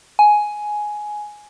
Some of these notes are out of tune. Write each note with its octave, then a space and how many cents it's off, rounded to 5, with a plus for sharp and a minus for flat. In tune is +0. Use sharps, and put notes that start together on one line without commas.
G#5 +10